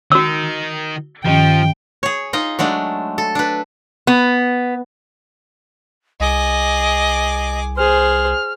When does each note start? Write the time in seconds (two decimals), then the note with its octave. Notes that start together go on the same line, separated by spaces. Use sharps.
0.12 D#3 D#4 F#4 E6
1.26 G2 D#3 F3 C#4 G5
2.03 G#4 C#5
2.33 D#4 F4 D#5
2.59 F#3 G#3 A3 D4
3.18 A4
3.35 D4 B4
4.07 B3
6.20 C2 G#4 D#5 D6
7.77 G#4 C5 F6